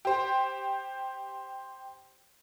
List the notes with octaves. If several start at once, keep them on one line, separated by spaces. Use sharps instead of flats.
G4 C5